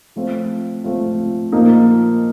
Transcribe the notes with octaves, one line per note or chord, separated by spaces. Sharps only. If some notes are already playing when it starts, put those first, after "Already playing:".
F3 A3 C4 F4
F3 A3 C4 F4
A#2 F3 A#3 D#4